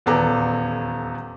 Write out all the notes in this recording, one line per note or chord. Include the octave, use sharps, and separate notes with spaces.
D#1 E2 B3 A4 A#5 D6